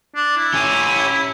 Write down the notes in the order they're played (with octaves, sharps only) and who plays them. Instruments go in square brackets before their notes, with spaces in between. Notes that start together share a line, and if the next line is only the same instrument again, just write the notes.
[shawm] D4
E4
[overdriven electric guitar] C#4 G4